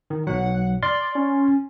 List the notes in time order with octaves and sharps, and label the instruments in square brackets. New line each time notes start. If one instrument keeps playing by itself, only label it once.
[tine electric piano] D#3
[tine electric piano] B1 F#3 [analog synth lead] F#5
[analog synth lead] D5 [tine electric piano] C6 F6 A6
[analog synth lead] C#4